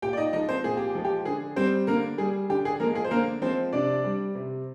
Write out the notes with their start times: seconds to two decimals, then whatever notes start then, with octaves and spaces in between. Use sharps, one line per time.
0.02 A#2 G4 G5
0.13 D5
0.17 D#4 D#5
0.33 F3 D#4 D#5
0.36 G#3
0.49 C4 C5
0.64 A#2 G#4
0.77 G4
0.95 F3 G#3
1.05 G4
1.25 D3 G#4
1.56 G3 C4 C5
1.87 D3 A#3 A#4
2.18 G3 G#4
2.49 D3 G4
2.65 G#4
2.80 F3 A#3 A#4
2.84 G#3
2.95 G#4
3.05 C5
3.11 D3 A#3 A#4
3.42 F3 G#3 C4 C5
3.73 C3 D4 D5
4.04 G3
4.35 C3